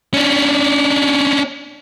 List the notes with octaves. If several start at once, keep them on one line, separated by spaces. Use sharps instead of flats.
C#4 D4